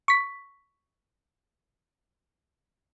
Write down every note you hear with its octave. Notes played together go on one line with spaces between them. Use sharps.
C#6 B6